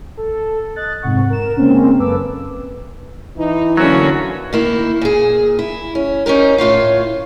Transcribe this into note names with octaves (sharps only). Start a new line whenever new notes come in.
A4
D#5 F#6 A6
F2 G#2 C3 F#5 C#6
A#4 E7
C#3 G#3 A#3 C4 C#4
F#2 A#3 A4 B4 D6 E6
E3 D#4 E4
D2 D3 F#3 A#3 C#4 F#4
D#3 A#3 E4
A#2 G#4
E4
C#4
C#4 D#4 G4 A#4
A2 F4 C#5 F5